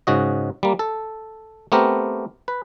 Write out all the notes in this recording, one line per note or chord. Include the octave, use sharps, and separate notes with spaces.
G#2 C#3 F#4 D#5
G3 A#3
A4
A3 B3 C4 G4 A#4
B4